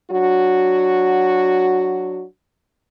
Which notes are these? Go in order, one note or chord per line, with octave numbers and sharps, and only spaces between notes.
F#3 D4 F#4